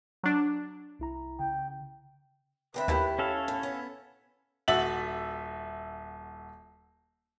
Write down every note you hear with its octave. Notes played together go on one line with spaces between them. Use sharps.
F#3 D4
C2 E4 A#5
C#3 G5
D2 C4 B4 E5
D#2 A3 E4 G4
C#4 A4 C#5 F5
A2
B3
D#1 F#4 E5 A6 F#7